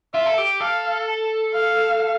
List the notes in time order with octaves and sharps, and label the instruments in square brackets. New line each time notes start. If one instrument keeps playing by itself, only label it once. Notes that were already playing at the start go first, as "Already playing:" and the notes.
[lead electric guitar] F4 [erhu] E5
[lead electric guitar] A4
G4
[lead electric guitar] A4 [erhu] F5
[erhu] F5